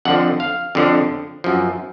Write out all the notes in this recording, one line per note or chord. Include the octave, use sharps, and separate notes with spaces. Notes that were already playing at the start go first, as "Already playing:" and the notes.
F2 D3 F3 F#5
F5
F2 D3 F3
F#2 F3